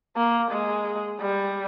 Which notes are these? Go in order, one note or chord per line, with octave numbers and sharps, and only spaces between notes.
A#3
G#3
G3